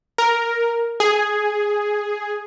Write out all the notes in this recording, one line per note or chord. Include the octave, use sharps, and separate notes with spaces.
A#4
G#4